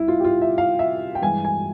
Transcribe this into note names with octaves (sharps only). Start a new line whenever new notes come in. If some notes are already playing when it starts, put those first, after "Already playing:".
Already playing: C2 E4
F4
G4
F4
E5
F5
E5
G5
G2 E3 G#3 G#5
G#5